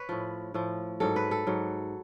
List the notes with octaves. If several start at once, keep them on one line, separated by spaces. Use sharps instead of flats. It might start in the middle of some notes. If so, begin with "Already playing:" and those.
Already playing: B4 C#5
A2 F3
A2 F3
G#2 F#3 A4
B4
A4
G#2 F#3